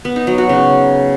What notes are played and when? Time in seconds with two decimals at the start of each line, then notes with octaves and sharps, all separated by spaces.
0.05 B3
0.16 D#4
0.27 F#3
0.38 F#4
0.49 C#3